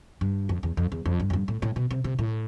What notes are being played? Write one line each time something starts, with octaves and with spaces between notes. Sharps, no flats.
G2
F2
E2
F2
E2
F2
G2
F2
G2
A2
A2
B2
C3
C3
A2